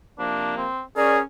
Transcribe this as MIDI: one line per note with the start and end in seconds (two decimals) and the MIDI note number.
0.19 0.66 48
0.19 0.66 53
0.19 0.66 58
0.19 0.55 62
0.58 0.82 60
0.97 1.23 61
0.97 1.21 68
0.97 1.20 70
0.97 1.15 74